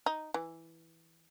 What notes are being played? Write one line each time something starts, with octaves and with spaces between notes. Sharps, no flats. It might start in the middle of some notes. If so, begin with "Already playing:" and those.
D#4
E3